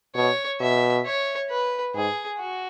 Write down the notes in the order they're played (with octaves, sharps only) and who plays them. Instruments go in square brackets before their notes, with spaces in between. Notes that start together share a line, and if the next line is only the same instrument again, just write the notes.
[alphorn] B2 [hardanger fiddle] C#5
[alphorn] B2 [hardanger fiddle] E5
[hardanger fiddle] C#5
B4
[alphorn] G#2 [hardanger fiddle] G#4
[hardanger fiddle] F#4